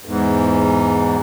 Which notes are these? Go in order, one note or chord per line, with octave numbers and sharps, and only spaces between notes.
E2 G#2